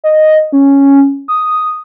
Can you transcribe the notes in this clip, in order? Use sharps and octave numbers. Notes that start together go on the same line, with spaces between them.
D#5
C#4
D#6